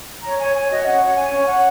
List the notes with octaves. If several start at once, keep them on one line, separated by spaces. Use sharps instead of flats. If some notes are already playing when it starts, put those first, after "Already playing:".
C#5 A#5
C#5 G#5
C#5 G#5
F#4 D#5
C#4 F#5
C#5
C#5 G#5
C#4
C#5 F#5